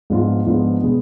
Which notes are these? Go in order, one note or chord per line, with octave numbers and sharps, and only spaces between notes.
G#2 F3 B3 D4 F4
G#2 F3 B3 D4 F4
B2 G#3 B3 D4